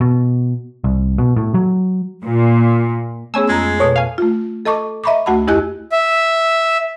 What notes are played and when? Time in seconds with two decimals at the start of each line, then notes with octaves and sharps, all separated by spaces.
0.01 B2
0.84 C2
1.18 B2
1.36 A2
1.54 F#3
2.23 A#2
3.34 A3 B3 C#4 G#4 G#5 E6
3.49 F2 G#3 A#5
3.80 B2 A4 C#5 A5
3.96 F5 G#5
4.18 A3 F4
4.65 A4 D#5 A5 C#6 D6
5.04 D#5 E5 A#5 B5 C#6 D6
5.26 D2 A3 F#4 F#5 A5 B5
5.47 F2 E4 G4 D#5 G#5 F#6
5.92 E5